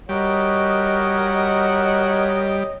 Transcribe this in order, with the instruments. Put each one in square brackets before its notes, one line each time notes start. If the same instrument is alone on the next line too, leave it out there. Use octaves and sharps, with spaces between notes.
[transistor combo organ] G3 [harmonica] F#4 A#4 [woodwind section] C#5 D#5